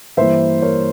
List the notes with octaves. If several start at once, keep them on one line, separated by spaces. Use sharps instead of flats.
G2 E3 A#3 C5 E5
A#4 C#5